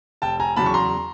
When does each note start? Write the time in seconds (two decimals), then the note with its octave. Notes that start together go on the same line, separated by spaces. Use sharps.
0.22 F1 G5 A5
0.40 G#5 A#5
0.56 E2 C#3 F#3 A5 B5
0.66 C#6
0.74 A#5 C6